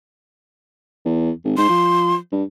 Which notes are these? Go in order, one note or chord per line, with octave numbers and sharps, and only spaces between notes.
E2
G#1
G#2 C6
F3
G2